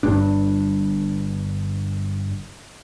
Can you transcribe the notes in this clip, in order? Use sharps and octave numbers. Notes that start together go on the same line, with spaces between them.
G1 G2 D4